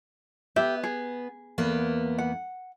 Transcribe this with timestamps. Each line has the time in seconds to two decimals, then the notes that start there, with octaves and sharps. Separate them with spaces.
0.56 B3 G4 E5
0.83 G#4
1.58 E2 A#3 B3
2.18 F#5